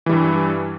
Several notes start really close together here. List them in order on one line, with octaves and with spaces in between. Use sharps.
E3 G3 G2